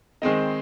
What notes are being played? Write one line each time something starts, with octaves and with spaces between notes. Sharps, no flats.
D#3 G#3 C4 D#4